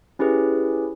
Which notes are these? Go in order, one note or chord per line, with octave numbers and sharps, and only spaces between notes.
C#4 E4 G4 G#4 B4